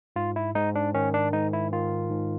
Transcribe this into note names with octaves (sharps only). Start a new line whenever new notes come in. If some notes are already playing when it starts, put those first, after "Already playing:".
G#2 F4
E4
G#2 D#4
D4
D#3 C#4
D4
G#2 D#4
E4
D#3 F4
G#2